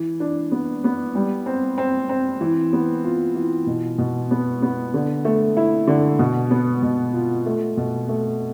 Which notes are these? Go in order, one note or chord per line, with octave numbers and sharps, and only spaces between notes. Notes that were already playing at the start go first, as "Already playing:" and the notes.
Already playing: E3
D4
B3
B3
G3
C4
C4
C4
E3
B3
F4
E3
B2
B2
B3
B3
D3
A3
E4
D3
B2
B3
B2
F4
A3
B2
A3